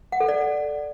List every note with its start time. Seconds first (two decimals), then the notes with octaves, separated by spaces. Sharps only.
0.12 F#5
0.20 A4
0.29 D5